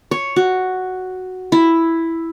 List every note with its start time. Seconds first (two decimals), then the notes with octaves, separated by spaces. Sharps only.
0.11 C#5
0.36 F#4
1.52 E4